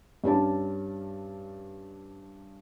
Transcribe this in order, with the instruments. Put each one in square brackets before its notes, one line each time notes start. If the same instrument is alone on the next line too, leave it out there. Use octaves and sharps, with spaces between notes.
[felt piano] G2 C#4 D4 A5